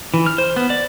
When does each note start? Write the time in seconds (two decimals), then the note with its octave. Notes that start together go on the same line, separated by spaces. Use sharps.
0.14 E3
0.26 F6
0.38 C5
0.56 B3
0.70 D5